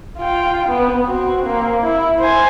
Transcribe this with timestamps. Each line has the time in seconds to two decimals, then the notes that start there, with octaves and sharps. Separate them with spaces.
0.18 F4 G5
0.68 B3
1.06 C4 F#4
1.45 A#3 C4
1.81 E4
2.19 C5 G#5